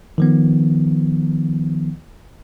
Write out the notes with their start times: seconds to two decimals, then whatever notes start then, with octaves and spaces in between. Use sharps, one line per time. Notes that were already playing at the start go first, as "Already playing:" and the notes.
0.18 D#3 F3 B3